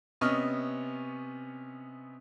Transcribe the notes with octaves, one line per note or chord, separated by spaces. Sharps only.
C3 B3 C#4 D#5 C#6 F6